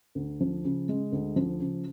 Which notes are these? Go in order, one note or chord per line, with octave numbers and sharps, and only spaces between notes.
D2
F3
C#3
G#3
D2
F3
C#3